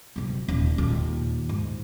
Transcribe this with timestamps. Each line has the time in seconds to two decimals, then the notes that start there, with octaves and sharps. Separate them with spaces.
0.16 C3 F#3
0.48 D#1
0.78 D#2 A#2
1.49 G#2